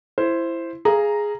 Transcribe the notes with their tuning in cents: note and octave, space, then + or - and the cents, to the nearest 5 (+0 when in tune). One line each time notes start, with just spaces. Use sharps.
E4 +15 C5 +0
G#4 +0 F5 -25 A#5 +0